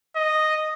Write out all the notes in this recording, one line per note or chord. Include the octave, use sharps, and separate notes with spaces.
D#5